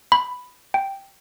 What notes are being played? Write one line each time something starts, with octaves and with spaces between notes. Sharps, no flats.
B5
G5